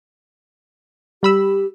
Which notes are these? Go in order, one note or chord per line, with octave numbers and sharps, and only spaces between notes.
G3 G4 B5 E6